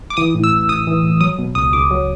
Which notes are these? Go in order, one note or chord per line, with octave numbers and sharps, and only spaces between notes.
D6
E3 D#6
A2
E6
A1
A1 D#6
E3
A2
F#3 D#6
B2
C#2 D#6
C#2 D6
F#3